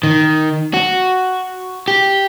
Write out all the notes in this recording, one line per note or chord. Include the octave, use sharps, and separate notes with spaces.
D#3
F#4
G4